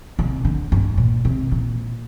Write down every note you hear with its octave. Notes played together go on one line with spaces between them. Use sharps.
C3
D3
G2
A#2
C3
A#2